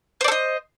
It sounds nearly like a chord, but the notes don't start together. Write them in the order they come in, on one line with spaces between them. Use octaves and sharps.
C5 D5 A4 D#5